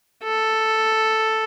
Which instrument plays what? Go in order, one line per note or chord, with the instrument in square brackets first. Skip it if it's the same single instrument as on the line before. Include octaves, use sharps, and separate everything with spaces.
[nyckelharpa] A4